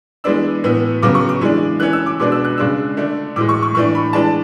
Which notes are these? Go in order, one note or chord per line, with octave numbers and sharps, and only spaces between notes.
E3 G#3 B3 D4 E6
A2 E3 B3
C#3 F#3 B3 D6
C#6
D6
E3 G#3 D4
E3 A3 C#4 F#6
E6
D6
B2 G#3 B3 D4 D6
E6
F#6
C#3 G#3 D4 E6
D3 A3 D4
A2 E3 G#3 D6
C#6
C#6
A2 E3 A3 D4 C#6
B5
E3 G#3 D4 A5